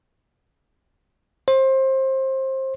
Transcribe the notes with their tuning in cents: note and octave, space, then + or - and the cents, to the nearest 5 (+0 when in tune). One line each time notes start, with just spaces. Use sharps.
C5 +25